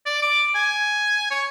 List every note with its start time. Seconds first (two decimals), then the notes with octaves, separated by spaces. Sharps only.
0.06 D5
0.22 D6
0.55 G#5
1.30 C#5